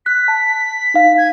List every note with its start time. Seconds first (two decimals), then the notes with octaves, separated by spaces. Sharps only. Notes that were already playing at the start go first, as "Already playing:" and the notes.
0.06 F#6 B6
0.28 A5
0.94 D#4 F5
1.18 G#6